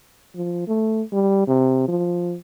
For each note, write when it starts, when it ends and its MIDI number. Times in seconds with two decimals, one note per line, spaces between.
0.35 0.67 53
0.67 1.02 57
1.12 1.46 55
1.47 1.84 48
1.88 2.35 53